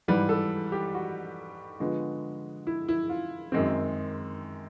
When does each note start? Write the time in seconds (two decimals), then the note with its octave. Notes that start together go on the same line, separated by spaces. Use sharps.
0.08 G#2 E3 G3 B4
0.29 A4
0.72 G4
0.95 F#4
1.80 D3 F3 G#3 B3
2.67 E4
2.89 E4
3.09 F4
3.52 F#2 D#3 G#3 C4